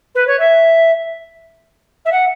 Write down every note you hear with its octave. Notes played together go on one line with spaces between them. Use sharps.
B4
C#5
E5
E5
F#5